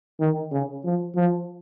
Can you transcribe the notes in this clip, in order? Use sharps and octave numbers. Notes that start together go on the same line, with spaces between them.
D#3
C#3
F3
F3